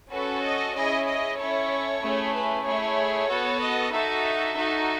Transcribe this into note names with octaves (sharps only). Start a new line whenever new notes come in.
C#4 F#4 A4 B4
D#5
C#4 E4 G#4 D#5
D#5
C#4 E4 A4 C#5
A3 C#4 E4 G#4
B4
A3 E4 G#4 C#5
B3 F#4 A4
D#5
D#4 F#4 A4 E5
D#4 F#4 A4